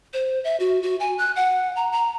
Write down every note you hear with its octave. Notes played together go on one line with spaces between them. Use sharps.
C5
E5
F#4
F#4
G#5
F#6
F#5
A#5
A#5